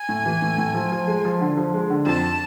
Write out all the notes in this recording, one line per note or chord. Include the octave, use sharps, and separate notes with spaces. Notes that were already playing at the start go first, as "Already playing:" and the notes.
Already playing: G#5
A2
E3
A2
A2
F3
F3
G#3
F3
D3
F3
G#3
D3
F2 A5